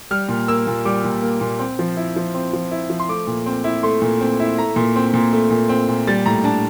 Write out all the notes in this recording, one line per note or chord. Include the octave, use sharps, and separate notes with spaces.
G3 F6
A#2
A#3 E6
A#2
G3 D6
A#2
A#3
A#2
C4
F3
E4
F3
C4
F3
E4
F3
C6
A3 D6
A#2
C4
E4
A3 C6
A#2
C4
E4
A3 A#5
A#2
C4
A#2
A3
A#2
C4
A#2
G3 A6
A2 A#5
D4 A5